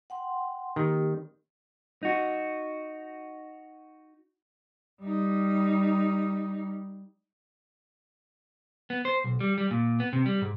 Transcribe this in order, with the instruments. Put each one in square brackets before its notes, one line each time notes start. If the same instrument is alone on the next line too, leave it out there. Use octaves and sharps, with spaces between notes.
[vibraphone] F#5 G5 C6
[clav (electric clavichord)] D#3 [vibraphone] A#3 G4
[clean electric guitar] D#4 F#4
[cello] G3 D#4
[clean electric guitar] B3
C5
B1
G3
G3
A#2
B3
C3
G3
G#2